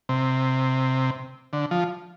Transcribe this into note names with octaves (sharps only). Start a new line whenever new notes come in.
C3
D3
F3